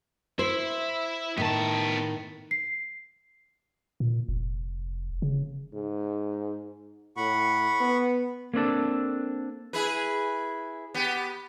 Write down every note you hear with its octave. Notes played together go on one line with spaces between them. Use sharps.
E4 C5
A2 D#3 B3 A5
C7
A#2
F1
C#3
G#2
A2 F#5 B5 C#6
B3
A#3 C4 D4 A4
E4 G#4 B4
B3 G4